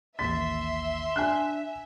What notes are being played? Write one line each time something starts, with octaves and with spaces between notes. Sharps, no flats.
A1 D#2 E5 C6 A6 B6
D4 G#5 F#6